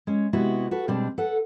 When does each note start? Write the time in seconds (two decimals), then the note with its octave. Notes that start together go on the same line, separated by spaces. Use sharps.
0.07 G#3 C#4
0.33 C3 G#3 B3 E4 F#4
0.71 F#4 A4 B4
0.88 B2 G3 G#3 C4 D4
1.18 A4 B4 F#5